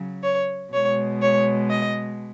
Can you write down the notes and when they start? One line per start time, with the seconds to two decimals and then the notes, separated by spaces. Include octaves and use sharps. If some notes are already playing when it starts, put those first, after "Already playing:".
Already playing: C#3 F#3
0.23 C#5
0.72 B2 G#3 C#5
1.22 C#5
1.70 D#5